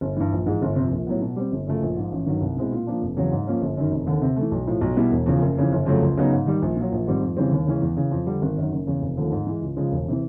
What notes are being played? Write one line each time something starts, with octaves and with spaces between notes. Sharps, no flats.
G1
G2 E3
A#1
G#2 E3 G#3
G1
F2 C3
A#1
A2 F#3 B3
B2
G3 C4
G1
F#2 C#3 F3 A3
A#1
G#2 F3
A1
G2 D#3 F#3
C2
B2 G#3 C4 E4
A#2
F3 A#3 D4
F1
E2 C#3 F#3
G#2
F3 A#3 C#4
G1
F#2 D#3
F1
D#2 D3
C3
E3 A3
B1
A2 F3
B1
B2 G3 B3 E4
E1
E2 C#3 F3
F#1
F2 C#3 E3
G1
F2 C#3 F#3 A3
C#2
C#3 F#3 B3 D#4
G#2
D#3 G3
A#1
A#2 F#3
A#1
G#2 D#3 G3 C4
F2
C#3 E3 G3 C4
D#2
C#3 E3 G#3 C#4
E2
C#3 E3
F2
D3 G3
G#1
F#2 D#3 F#3
F#1
E2 C#3
F1
D#2 D3 F3 A3
G#2
E3 G#3
C#2
C#3 F3 G#3
E1
C3 E3